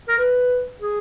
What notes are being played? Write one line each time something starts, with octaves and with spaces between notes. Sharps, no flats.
A#4
B4
G#4